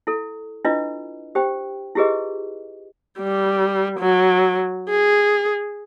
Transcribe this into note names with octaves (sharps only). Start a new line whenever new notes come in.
E4 A4
D4 E4 F4 B4 D#5
G4 C5 G5
E4 F4 G4 G#4 B4 D#5
G3
F#3
G#4